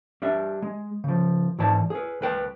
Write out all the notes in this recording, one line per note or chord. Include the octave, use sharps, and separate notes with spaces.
G3 D4 E5
G#3
C#3 F3
G#2 E3 D5 A5
G#4 B4
C2 B4 G5